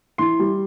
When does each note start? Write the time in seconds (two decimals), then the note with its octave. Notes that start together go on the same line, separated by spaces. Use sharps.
0.18 E3 C6
0.39 G3